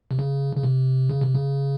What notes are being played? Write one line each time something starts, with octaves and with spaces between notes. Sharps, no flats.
C3
C#3
C#3
C3
C#3
C3
C#3